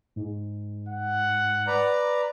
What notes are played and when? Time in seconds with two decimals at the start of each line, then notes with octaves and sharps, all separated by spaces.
0.16 G#2
0.89 F#5
1.67 B4 D5 A#5